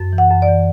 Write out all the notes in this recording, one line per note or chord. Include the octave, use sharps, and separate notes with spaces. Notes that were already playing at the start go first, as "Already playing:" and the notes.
Already playing: F#2
E3
F#5
F#2
D5
E3